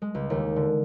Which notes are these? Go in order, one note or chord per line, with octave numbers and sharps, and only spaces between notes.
G#3
C#2
D#2
D3